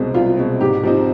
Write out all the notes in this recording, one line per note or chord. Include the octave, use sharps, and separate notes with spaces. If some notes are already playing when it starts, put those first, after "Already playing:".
Already playing: C2 B2 G#3 C4
C2 F4
B2 G#3 C4
G#2 G4
F3 C4 D#4 G4